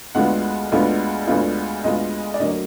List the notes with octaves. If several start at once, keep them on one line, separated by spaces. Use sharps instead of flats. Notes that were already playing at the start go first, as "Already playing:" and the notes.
D2 D3 G#3 B3 F4 F#5
D2 D3 G#3 B3 F4
D2 D3 G#3 B3 F4
D2 D3 G#3 B3 F4 D#5
D5
D2 D3 F#3 A#3 D#5